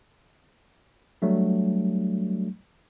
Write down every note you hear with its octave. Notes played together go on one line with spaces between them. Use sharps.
F#3 G3 A3 D4